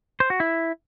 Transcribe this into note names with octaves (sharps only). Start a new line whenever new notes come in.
C5
F#4
E4